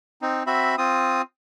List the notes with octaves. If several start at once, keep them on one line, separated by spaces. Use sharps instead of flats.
C4 D#4
C4 F#4 E5 B5
C4 F4 D#6